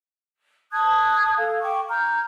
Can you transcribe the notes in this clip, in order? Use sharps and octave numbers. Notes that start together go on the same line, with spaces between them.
A5 D#6 F#6 G#6
A4 F5
G5 C#6 D6
A#5 F6 G6